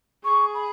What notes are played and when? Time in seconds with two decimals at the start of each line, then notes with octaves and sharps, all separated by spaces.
0.24 G#4 C#6
0.54 B5